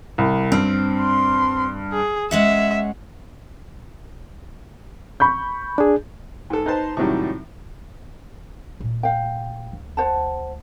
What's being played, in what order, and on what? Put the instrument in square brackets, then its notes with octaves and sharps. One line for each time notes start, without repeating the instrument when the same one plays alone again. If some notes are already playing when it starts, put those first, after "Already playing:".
[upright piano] C2
[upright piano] G2 [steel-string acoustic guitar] C4
[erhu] C6
G#4
[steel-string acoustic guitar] G#3 C#4 F#5 [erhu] E5
[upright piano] B5 C#6 G6
[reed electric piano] D4 G#4
[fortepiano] G#2 A4
D#4 B4 C5 A5
A2 C3 D#3 F#3 G3
[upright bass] A#2 A3
[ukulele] F5 G5
[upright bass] D2
[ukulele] C5 F#5 A5